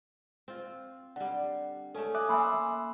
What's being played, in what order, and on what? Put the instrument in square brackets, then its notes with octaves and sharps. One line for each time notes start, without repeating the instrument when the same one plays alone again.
[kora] C4 F4
[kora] D3 G3 [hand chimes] F#5
[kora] A3 C#4 [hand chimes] A4 G#5
[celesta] E5 [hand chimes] D6 D#6 F#6
[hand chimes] A#3 C6 E6 [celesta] E5 G#5 B5